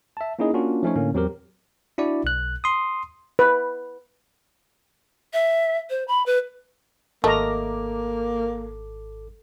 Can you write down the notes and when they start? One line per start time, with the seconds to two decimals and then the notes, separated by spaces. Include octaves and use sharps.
0.17 E5 A5
0.39 A#3 C#4 D#4 E4 G#4 D#5
0.54 A#3 C#4 D4 F4 F#4
0.83 F3 A3 C#4 D#4 C#5
0.96 A2 D3 A#3 C#4
1.13 E2 F#3 C4 G4 A#4
1.98 D4 E4 F#4 D5
2.24 B1 F#6
2.64 C6 D#6
3.39 B4
5.33 E5
5.90 C5
6.08 B5
6.26 B4
7.24 G#1 A3 A#3 A4 A#4 D#5 A#5 D6